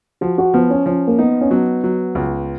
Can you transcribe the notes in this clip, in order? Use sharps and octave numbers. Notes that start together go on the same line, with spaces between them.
F3 F#4
F#4
F3 B3
C#4
F3 C#4
A#3
B3 D#4
C#4
F#3 B3
F#3
C#2